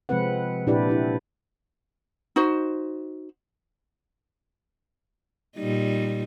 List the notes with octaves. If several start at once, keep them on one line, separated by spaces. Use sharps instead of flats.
C3 F3 G#3 C4 B4 F#5
A#2 D4 E4 G4 B4 D5
D4 E4
D#4 F#4 C5
A#2 G3 D#4